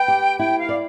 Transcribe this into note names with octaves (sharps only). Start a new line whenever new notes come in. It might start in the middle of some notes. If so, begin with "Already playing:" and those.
Already playing: B4 G5
G4
E4 G5
F5
D5